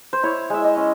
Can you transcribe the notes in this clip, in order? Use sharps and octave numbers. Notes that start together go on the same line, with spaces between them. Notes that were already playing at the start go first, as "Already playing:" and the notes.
C5
E4 C#5
G#3 E5
D#5
C#4